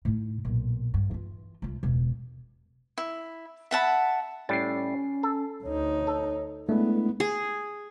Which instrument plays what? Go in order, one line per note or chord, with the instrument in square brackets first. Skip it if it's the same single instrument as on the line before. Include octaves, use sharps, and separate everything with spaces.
[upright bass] A2 D#4
B1 A#2
G2
E3 F4
C2 F4
E1 C#2
[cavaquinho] E4
E5 F#5 A5 B5
[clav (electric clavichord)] A2 G3 [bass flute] C#4 [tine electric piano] A6 C7
[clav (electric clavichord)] A4
[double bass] D2 D#4 [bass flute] C#5
[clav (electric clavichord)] A4
[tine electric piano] G#3 A3 D4 [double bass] B3 [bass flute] E4
[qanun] G#4